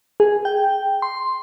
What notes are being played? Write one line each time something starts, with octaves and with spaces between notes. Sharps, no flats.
G#4
G5
C6